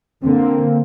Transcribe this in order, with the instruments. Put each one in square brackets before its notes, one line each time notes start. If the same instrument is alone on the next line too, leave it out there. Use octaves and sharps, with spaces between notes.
[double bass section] D3 [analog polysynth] A#3 C4